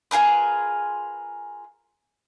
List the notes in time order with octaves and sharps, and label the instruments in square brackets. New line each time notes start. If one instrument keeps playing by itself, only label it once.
[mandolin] F4 G#4 A#4 B4